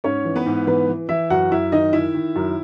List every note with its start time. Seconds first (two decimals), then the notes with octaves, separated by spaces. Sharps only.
0.04 G#2 C#4 C#5
0.25 E3
0.36 B3 B4
0.46 G#2
0.67 E3 B3 B4
0.89 E3
1.09 E3 E4 E5
1.30 F#2 F#4 F#5
1.51 F#2 E4 E5
1.72 D#3 D#4 D#5
1.93 D#3 E4 E5
2.14 D#3
2.36 F#2